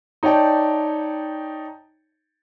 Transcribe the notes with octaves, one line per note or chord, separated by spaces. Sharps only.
D#4 C#5 D5 G5 A5